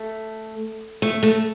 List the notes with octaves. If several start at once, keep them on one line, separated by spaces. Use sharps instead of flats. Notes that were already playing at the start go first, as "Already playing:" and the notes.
Already playing: A3
A3
A3